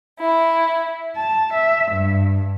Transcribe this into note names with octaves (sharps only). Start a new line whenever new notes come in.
E4
A5
E5
G2